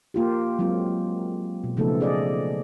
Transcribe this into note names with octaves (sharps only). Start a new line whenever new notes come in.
A#3 F4 G4
F#3 G#3 C4 F4
B2
C#3 F3 A3 B3 D#4 A4
G#4 D5 D#5